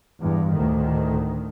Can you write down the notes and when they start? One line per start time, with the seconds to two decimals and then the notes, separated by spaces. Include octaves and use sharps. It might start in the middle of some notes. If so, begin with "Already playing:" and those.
0.21 E2 G2
0.53 D2 A2 D#3